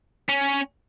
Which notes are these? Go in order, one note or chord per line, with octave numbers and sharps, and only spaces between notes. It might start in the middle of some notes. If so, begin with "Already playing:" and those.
C#4